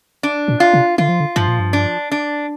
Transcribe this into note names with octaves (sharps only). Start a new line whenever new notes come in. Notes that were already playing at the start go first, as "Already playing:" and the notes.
D4
A#2
F4
C3
D3 F4
F3
D3
G2 F3
A#2
G2
D4
D4